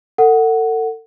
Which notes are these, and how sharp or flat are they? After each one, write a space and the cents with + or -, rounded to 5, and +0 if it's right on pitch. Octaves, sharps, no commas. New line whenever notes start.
A4 +40 F#5 +0